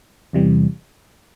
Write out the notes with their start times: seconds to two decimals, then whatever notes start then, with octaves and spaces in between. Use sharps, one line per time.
0.33 E2 C3 E3 G3